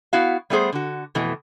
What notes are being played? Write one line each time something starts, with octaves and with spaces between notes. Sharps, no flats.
B3 E4 F#4 F5
G3 A3 B3 G#4 C5
D3 F#4
F2 B2 E3 A3